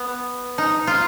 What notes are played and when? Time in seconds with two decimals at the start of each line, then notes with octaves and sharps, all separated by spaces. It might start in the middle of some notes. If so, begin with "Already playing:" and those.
Already playing: B3
0.58 D#4
0.87 F4